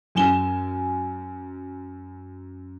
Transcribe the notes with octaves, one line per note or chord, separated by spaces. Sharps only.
F#2 G#5 E7 G7